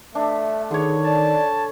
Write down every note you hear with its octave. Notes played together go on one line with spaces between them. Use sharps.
A3 D4 E5
D3 D#3 G#4 C#5
D5 A5